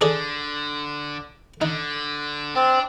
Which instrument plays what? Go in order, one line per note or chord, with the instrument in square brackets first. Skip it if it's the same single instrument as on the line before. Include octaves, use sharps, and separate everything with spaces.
[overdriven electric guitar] D3 [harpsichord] G#4 A4 D5
[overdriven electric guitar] D3 [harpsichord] D#4
[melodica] C4 [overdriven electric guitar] D4